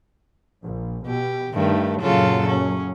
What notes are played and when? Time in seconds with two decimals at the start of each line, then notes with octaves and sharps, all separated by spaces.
0.63 A#1
1.07 B2 G4
1.54 G2 D#3 A3
2.01 F#2 A#2 C#3 F#3 F4 A4
2.48 C#4